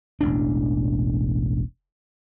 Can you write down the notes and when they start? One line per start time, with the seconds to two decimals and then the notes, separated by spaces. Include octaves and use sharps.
0.21 E1 A1 D4